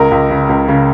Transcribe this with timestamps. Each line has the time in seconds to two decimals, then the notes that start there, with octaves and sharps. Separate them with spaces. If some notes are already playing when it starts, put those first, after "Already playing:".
Already playing: C#2 A#4
0.11 C#2
0.30 C#3
0.49 C#2
0.68 C#3